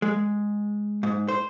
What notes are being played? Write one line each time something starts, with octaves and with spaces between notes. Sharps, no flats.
G#3
G#2
C5